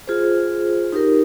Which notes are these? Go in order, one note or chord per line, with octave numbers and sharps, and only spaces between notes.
F4 G#4 C5
D#4 G4 A#4